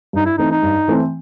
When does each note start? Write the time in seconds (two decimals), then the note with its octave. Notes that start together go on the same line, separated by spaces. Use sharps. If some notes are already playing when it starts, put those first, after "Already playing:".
0.13 G2 D#4
0.26 E4
0.38 E3 A3 C4 D#4
0.51 D#4
0.63 G2
0.88 E3 A3 C4